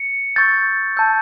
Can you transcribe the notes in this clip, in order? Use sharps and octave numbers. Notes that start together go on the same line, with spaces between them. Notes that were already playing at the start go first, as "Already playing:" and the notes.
Already playing: C#7
C#6 E6 G6 A6
A5 E6 G6